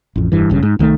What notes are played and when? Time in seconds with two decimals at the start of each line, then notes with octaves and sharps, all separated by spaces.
0.16 A1 F2
0.32 F1 G2 E3
0.50 G#1 G2 C#3
0.63 G#2
0.79 C2 D#3 G#3 A3